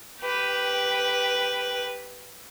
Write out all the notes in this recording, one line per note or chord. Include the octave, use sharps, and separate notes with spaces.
G4 B4